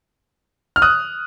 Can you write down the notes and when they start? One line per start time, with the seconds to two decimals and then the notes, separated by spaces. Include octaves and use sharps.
0.76 F6
0.82 D#6 F#6